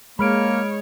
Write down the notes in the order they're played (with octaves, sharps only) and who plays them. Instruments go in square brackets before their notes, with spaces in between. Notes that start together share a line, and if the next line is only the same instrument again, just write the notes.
[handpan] G#3 [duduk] A#3 [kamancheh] C#5 [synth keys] B5 F6 D7